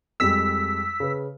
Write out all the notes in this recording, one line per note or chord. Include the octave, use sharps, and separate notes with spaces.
F2 G3 G#3 E6 B6
C#3 B4